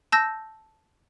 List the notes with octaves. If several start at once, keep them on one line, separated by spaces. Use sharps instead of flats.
A5 E6 G6 A#6